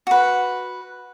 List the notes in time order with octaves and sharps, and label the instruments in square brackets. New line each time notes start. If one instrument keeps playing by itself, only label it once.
[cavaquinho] F#4 B4